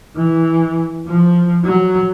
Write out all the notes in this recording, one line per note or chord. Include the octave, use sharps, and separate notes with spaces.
E3
F3
F#3